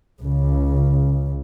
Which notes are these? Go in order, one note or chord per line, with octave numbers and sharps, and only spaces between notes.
C#2 C#3